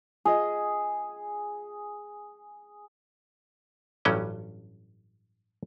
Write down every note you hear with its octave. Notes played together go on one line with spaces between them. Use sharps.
F4 G#4 D#5
A1 G2 F#3 G3 C#4 G5